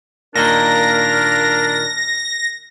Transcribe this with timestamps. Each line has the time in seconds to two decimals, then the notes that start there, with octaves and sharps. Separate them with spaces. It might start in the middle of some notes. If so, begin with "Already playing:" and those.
0.36 A#2 D#3 A#3 D4 A#4 A#6